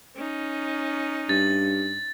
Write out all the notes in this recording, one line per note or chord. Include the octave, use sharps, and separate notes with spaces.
C#4 D#4
G2 A6